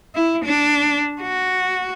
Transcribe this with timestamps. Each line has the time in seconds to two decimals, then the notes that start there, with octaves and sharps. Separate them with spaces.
0.15 E4
0.45 D4
1.22 F#4